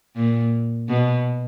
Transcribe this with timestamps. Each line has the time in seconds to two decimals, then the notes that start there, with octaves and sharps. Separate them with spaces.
0.16 A#2
0.89 B2